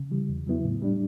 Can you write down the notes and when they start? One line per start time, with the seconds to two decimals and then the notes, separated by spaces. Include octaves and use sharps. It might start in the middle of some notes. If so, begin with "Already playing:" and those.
Already playing: C#3
0.11 E3 G3
0.29 E2
0.47 C#3 F#3 B3 E4
0.64 A2
0.82 G3 D4